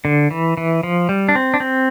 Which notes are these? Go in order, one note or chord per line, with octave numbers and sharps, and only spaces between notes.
D3
E3
E3
F3
G3
D4
C4
D4
C4